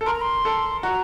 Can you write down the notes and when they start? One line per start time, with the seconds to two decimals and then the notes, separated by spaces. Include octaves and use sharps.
0.01 A4
0.06 A#4 C6
0.13 A#5
0.22 C6
0.45 A4
0.83 F#4 A#5